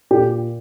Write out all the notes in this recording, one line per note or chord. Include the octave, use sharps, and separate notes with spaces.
A#2 G4